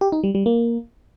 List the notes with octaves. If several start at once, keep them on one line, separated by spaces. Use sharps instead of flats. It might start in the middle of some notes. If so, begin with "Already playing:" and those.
G4
D#4
G3
G3
A#3